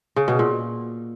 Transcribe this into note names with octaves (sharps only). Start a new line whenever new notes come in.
C#3
B2
A#2